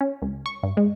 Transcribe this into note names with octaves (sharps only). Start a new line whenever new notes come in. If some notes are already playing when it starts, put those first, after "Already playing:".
C#4
C#2
C#6
G2
G#3